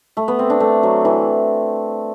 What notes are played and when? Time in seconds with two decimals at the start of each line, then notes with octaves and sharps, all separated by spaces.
0.17 A3
0.28 B3
0.39 C4
0.50 D4
0.60 A3
0.83 F#3
1.05 E3